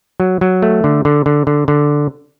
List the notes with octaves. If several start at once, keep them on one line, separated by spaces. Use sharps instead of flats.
F#3
F#3
A3
D3
D3
D3
D3
D3